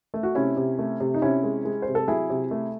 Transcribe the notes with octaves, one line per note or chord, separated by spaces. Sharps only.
A3
F#4
C3 C#4 E4
C3
A3
C3
D#4
C3 C#4 E4
G#3
G#3
C3 C5
A4
F#3 E4 G#4
C3
A3